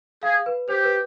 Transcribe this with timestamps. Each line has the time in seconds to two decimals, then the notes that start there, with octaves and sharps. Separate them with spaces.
0.23 G#4 F5
0.46 B4
0.69 G4 C5
0.84 B4